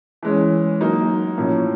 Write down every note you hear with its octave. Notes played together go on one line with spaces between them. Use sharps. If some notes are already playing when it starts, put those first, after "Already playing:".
E3 G#3 C#4
F#3 A#3 D#4
A2 F3 A#3 C#4